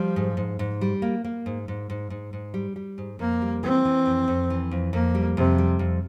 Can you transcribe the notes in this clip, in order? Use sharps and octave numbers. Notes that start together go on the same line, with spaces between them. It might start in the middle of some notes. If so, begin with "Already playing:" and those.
Already playing: F3 G3
G#2
G#2
G#2
G3
A#3
A#3
G#2
G#2
G#2
G#2
G#2
G3
G3
G#2
F2 A#3
G3
E3 C4
E3
F2
F2
E3
F2
F2 A#3
G3
F2 C3
G3
F2